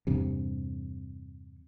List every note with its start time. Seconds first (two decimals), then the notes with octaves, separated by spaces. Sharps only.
0.07 E2 G2 C3